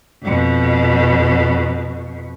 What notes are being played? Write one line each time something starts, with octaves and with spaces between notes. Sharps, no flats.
F2 B2